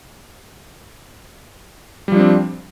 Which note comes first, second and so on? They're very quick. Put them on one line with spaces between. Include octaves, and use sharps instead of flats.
G3 F3 D4 C4